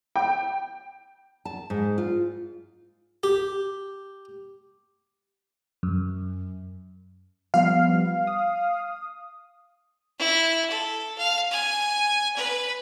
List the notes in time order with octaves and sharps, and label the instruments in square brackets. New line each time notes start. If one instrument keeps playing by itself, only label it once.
[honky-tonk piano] G5
[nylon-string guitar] A5
G#2
F4
[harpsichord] G4
[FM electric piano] F#2
[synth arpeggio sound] F3 G3 B3 [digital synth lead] F5
[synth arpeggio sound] D#6
[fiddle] E4
A4
F5
G#5
B4